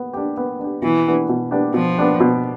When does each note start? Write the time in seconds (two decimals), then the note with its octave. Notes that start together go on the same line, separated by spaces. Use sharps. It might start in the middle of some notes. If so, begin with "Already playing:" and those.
Already playing: B3
0.13 D4 G4
0.37 B3
0.59 D4 G4
0.82 B2 E3
1.05 B3 D4 G4
1.29 B2
1.51 B3 D4 G4
1.74 B2 F3
1.97 B3 D4 G4
2.20 B2